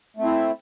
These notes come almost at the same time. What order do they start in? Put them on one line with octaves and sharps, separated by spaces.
A3 C4 E4